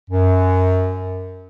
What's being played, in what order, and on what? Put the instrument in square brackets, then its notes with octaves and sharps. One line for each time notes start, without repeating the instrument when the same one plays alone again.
[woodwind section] F#2